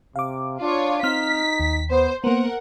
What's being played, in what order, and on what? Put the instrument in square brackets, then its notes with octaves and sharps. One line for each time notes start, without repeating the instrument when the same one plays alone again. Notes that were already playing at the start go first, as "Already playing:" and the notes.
[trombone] C3 [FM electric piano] F5 D6
[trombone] D4 [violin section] F4 C#5
[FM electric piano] C4 F6 [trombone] D#4 [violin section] B6
[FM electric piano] D#2
[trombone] B3 [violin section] C5
[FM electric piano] A#3 B3 [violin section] A#4 F#5 [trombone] C5